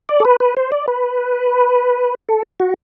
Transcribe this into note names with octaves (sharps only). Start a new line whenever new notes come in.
D5
A4
B4
B4
C5
D5
B4
A4
F#4